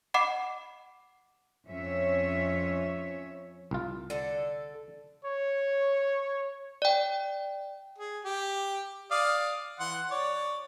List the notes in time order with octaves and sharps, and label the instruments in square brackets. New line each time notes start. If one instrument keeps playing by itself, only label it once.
[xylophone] D#5 F#5 B5 D6 C7
[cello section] F2 C#4 C#5 E5
[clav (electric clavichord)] C2 F4
[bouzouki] D3 A4
[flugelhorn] C#5
[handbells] D5 G5
[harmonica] G#4
G4
D5 F5 D#6
E3 F#5 C6
C#5 D5